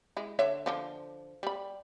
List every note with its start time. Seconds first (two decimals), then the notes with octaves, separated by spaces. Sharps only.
0.17 G#3 E4
0.39 D3 C#5 E5
0.66 D3 F3
1.43 G3 B5